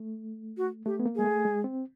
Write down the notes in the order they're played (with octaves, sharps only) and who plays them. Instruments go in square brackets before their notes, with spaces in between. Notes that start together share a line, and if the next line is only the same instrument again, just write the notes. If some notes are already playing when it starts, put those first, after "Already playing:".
Already playing: [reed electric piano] A3
[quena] F#4
[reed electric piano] A3 [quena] G4
[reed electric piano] B3
A#3
[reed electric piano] G#3 [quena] G#4
[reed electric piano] A3
G#3
C4